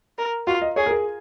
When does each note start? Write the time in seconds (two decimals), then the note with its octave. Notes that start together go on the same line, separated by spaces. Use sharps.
0.18 A#4
0.47 F4 F#4
0.62 D#5
0.76 G#4 C#5
0.86 A#4
0.91 G#4